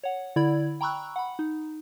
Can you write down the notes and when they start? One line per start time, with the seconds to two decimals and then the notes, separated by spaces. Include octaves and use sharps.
0.04 C#5 F#5
0.36 D3 E4 D5 B5 G#6
0.81 G5 A#5 B5 C#6 E6 F#6
1.16 F#5 B5
1.39 D#4